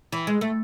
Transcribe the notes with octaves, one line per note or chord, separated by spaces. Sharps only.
E3
G#3
A3